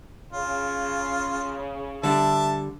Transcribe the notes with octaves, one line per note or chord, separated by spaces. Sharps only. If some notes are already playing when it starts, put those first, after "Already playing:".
C#3 F4
D3 G3 E5 A5